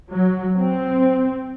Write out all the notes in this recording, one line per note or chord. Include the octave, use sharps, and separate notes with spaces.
F#3
C4